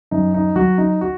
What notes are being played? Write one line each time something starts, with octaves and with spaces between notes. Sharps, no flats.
F#2 D#4
D#4
F#3 F#4
D#4
F#4